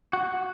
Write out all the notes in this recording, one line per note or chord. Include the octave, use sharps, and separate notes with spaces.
F#4